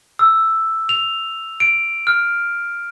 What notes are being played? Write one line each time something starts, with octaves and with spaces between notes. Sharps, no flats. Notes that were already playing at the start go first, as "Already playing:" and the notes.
E6
F7
D7
F6